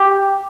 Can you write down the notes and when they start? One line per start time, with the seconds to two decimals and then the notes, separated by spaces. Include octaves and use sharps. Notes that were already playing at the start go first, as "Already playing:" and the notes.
Already playing: G4